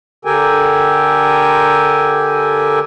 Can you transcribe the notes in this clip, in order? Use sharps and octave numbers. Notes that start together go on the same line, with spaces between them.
D3 G4 A4 A#4 G5 G#5